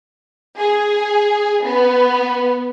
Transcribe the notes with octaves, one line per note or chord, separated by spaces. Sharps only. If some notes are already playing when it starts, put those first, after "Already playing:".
G#4
B3